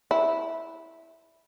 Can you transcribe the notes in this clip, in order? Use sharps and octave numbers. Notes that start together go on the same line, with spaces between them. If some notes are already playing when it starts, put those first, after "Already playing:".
E4